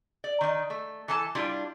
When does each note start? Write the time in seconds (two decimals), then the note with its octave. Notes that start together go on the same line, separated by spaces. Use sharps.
0.24 D5
0.41 D#3 D#4
0.70 A3
1.08 E3 A4 A5
1.35 G3 D4 E4 F4